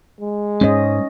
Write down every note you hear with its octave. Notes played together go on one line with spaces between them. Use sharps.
G#3
G#2 C#4 D#5